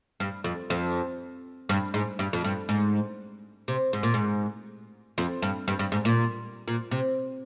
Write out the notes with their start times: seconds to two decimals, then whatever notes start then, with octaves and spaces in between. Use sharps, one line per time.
0.20 G2
0.44 F2
0.70 F2
1.69 G2
1.94 G#2
2.19 G2
2.33 F2
2.44 G2
2.69 G#2
3.68 C3
3.93 G#2
4.03 A#2
4.14 G#2
5.18 F2
5.42 G2
5.68 G2
5.79 G2
5.92 G#2
6.05 A#2
6.68 A#2
6.91 C3